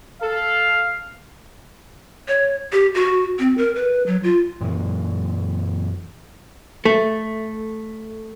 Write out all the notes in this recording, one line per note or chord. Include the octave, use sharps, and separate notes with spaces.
A4 F5
C#5
G4
F#4
C4
A#4
B4
F#3
F4
F#2 A#2 E3
A3